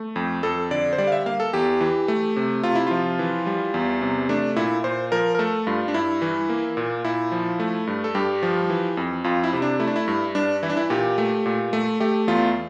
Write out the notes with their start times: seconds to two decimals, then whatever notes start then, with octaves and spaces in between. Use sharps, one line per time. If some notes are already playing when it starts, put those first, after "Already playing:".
Already playing: A3
0.16 F2
0.43 F2 A4
0.71 D3 D5
0.93 C5
0.98 G3 D5
1.07 F5
1.12 E5
1.26 A#3 F5
1.40 A4
1.53 E2 G4
1.81 E3
2.08 A3
2.36 C3
2.63 C3 F4
2.75 E4
2.87 F3 F4
3.19 E3
3.47 G3
3.74 E2
4.02 C3
4.29 A3 D4
4.56 A#2 E4
4.84 A#2 C5
5.12 F3 A#4
5.35 A#4
5.39 A3 A4
5.67 G2 F4
5.88 D4
5.94 G2 E4
6.22 E3
6.49 A#3
6.77 A#2
7.04 A#2 E4
7.32 F3
7.60 A3
7.87 G2
8.04 A4
8.15 G2 G4
8.43 F3
8.70 E3
8.97 F2
9.24 F2 F4
9.44 E4
9.53 C3
9.62 D4
9.80 A3 E4
9.88 D4
9.96 E4
10.08 G2
10.35 G2 D4
10.63 E3 E4
10.70 D4
10.77 E4
10.90 A#2 G4
11.18 A3
11.46 A#2
11.73 A3
12.00 A3 G4
12.27 E2 F4